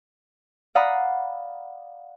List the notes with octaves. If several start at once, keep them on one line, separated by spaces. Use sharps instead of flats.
D5 F5 F#5 A#5 B5 D#6